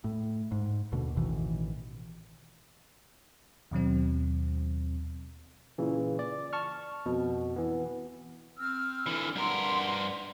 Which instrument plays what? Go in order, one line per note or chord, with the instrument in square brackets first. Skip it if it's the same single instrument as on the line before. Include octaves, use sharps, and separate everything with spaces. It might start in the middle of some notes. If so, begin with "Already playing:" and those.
[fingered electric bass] A2
G#2
D#2 B2 D3
A1 B2 D#3 E3
[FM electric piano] D#2 B2 F#3 C4
[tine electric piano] A#2 C#3 E3
D5
A5 C#6 F6
F2 B2
E3 B3
[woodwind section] C4 E6 F6
[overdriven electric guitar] D3 E3
[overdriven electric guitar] G2 A#4 [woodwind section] D5 F#5 C6